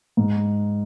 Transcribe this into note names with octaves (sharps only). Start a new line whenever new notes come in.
G#2